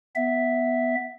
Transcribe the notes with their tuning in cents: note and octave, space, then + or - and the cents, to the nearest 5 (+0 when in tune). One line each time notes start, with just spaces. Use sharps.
B3 +0 E5 +0